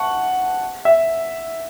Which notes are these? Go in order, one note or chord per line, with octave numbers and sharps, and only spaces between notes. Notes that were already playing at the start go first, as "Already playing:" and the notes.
Already playing: F#5 A5 C#6
E5